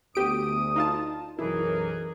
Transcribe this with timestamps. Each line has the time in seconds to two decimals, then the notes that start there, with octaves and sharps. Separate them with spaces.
0.15 D2 B3 G4 D#6 D7
0.76 D#4 F4 A5
1.39 B1 F#2 E3 E4 G#4 A#4